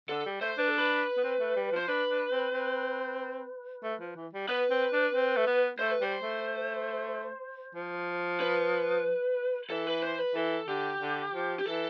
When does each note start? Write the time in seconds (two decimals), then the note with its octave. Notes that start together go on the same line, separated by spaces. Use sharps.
0.09 D3 A4
0.26 G3
0.41 A3 C5
0.58 D4 B4
0.68 A4
0.78 B4
1.17 B3
1.24 C4
1.40 A3
1.56 G3
1.72 F3 C5
1.88 D4 B4
2.10 D4
2.32 C4
2.54 C4
3.83 A3
4.00 F3
4.16 E3
4.33 G3
4.48 B3 B4
4.71 C4
4.93 D4
5.14 C4
5.37 A3
5.47 B3
5.79 A3 C5
5.91 B4
6.01 G3 C5
6.23 A3
7.75 F3
8.40 B4
9.70 E3 A4
9.87 B4
10.02 C5
10.19 B4
10.35 E3 A4
10.68 D3 G4
11.01 D3
11.33 F3
11.59 G4
11.66 E3 A4